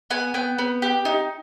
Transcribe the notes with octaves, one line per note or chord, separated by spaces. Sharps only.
B3 G#5
B3 G5
B3
G4
D#4